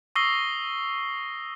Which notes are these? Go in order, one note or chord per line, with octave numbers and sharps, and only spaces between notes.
C#6 D#6 E6 A#6 C7 G7